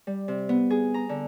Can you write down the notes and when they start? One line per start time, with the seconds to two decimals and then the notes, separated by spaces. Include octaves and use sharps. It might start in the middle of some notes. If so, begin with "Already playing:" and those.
0.07 G3
0.28 C3
0.49 B3
0.70 G#4
0.94 A#5
1.09 D3